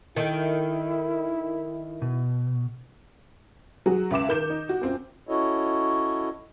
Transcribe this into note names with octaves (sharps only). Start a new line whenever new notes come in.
D#3 E4 A4 E5 G5
B2
F#3 F#4 G#4
C#2 E5 D6 E7
D#3 G6 E7
D#4
F#4
F#2 C4 F4
C#4 E4 F#4 A4 C#5 D#5